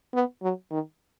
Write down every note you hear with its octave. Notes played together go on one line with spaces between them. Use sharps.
B3
F#3
D#3